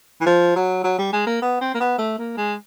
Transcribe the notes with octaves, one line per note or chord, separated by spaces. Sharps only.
E3
F3
F#3
F#3
G3
G#3
A#3
B3
C4
A#3
B3
A3
A#3
G#3